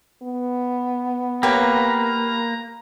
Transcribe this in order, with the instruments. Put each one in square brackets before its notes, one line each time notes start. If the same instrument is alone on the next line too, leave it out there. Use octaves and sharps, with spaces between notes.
[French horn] B3
[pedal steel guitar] A#3 [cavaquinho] G4 B4 C#5 [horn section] A#5